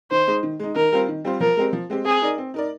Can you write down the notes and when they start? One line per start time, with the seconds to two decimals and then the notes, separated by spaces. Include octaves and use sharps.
0.11 D#3 C5
0.27 G#3 D#4
0.43 D#3
0.59 G#3 D#4
0.75 D#3 A#4
0.92 G3 C4 F4 C5
1.08 D#3
1.24 G3 C4 F4 C5
1.40 F3 A#4
1.57 G#3 C4 G4
1.73 F3
1.90 G#3 C4 G4
2.05 C4 G#4
2.22 D#4 A#4 D5
2.38 C4
2.54 D#4 A#4 D5